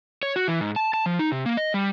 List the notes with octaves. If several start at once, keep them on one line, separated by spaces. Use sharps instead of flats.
C#5
F#4
E3
G#2
A5
A5
F3
D#4
C3
A#3
D#5
G3